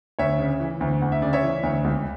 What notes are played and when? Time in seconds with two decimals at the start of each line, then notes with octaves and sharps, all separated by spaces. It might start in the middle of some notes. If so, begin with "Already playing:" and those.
0.19 D2 C#5 E5
0.39 C#3
0.60 E3
0.81 D2
1.01 D2 F#5
1.12 E5
1.22 C#3 D5
1.33 C#5 E5
1.43 E3
1.63 D2
1.85 C#2